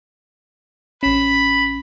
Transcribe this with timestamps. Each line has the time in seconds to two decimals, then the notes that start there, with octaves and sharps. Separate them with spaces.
1.03 A1 C#4 B5